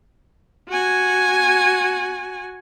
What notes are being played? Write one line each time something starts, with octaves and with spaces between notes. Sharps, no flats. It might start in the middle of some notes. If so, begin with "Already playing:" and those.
F#4 G#5